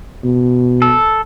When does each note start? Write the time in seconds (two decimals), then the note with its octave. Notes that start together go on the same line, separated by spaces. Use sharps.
0.24 B2
0.82 A4